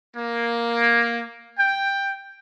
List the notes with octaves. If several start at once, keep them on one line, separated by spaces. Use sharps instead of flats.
A#3
G5